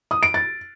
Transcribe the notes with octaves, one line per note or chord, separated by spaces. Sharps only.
D#6
D7
A6